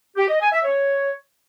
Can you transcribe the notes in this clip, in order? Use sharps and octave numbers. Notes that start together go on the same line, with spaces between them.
G4
D#5
G#5
E5
C#5